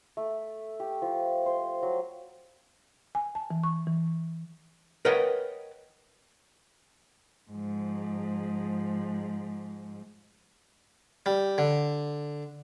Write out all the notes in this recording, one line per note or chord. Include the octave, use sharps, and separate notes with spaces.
A3
G4
F3
C5
F#3
G#5
A5
E3
C#6
E3
A#4 B4 C#5 D#5 F#5 G5
G#2 F3
G3
D3